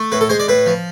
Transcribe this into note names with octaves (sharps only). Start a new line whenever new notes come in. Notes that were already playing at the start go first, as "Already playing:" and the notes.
Already playing: A3
A2 B4
A4
G#3 C5
D5
A2 B4
F3